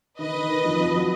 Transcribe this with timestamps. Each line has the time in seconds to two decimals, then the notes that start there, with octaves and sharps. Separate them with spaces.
0.19 D#3 B4 D#5
0.34 D#3
0.50 D#3
0.65 F2
0.80 F2
0.94 F#3